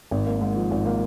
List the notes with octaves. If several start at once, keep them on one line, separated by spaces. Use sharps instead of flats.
G#1
A#3
G#2
F3
G#1
A#3